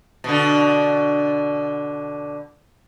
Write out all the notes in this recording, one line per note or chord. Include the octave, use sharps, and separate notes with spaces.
B2 D3